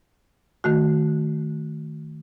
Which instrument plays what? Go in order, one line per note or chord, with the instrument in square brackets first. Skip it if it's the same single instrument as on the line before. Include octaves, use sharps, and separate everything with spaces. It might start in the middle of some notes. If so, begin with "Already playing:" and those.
[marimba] D#3 A3 F#4